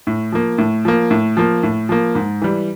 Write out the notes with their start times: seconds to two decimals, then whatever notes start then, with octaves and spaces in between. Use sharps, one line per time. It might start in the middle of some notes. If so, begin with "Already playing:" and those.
0.07 A2
0.32 F3 A#3
0.58 A2
0.85 F3 A#3
1.11 A2
1.37 F3 A#3
1.63 A2
1.89 F3 A#3
2.15 G#2
2.42 E3 G3